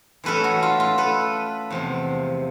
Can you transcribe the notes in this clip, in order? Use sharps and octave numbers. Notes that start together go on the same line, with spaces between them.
E3 A3 C#4 A4 B4
F#4
F4
F4
A4 B4
E2 C3 F3